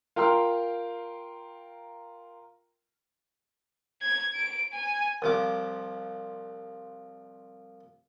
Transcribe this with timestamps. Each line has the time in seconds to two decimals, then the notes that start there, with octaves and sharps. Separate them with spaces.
0.16 F4 A#4 G5 A#5 C6 F6
4.02 G#6
4.35 D7
4.73 G#5
5.22 C2 F3 D6